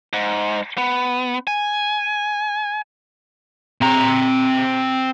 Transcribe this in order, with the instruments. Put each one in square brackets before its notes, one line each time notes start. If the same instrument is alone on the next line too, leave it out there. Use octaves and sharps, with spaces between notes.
[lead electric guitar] G#2
B3
G#5
[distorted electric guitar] C4 A#5